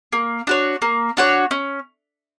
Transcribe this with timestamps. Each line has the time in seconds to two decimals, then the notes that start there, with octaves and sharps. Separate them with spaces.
0.13 A#3
0.47 D4 F#4 C#5
0.82 A#3
1.17 D4 F#4 C#5
1.51 C#4